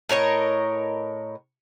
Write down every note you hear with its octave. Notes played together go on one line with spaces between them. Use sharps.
A2 A#4 C#5 D#5